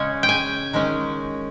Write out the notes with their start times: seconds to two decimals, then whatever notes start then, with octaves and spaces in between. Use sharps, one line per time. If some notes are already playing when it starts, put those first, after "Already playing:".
Already playing: C#3 G#3 C#4 G#5
0.23 G5
0.29 G#5
0.73 D#3 G#3 C#4